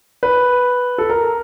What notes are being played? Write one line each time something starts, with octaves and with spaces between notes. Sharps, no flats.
B4
A4
A#4